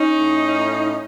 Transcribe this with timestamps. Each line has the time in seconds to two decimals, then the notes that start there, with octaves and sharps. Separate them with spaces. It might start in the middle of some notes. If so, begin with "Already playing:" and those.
Already playing: C#4 D#4
0.17 A2
0.57 A2